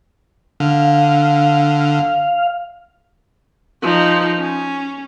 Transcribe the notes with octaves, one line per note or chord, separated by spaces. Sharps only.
D3 F5
F3 D#4
C#4